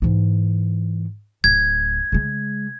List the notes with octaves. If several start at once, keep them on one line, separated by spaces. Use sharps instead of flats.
G#2 E3
D1 G#6
C#3 G#3